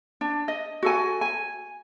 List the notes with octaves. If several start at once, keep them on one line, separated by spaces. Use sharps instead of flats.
D4
D#5
F#4 A4 G#5
G#5